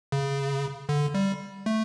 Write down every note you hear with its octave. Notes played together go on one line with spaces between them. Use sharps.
C#3
D3
G3
A3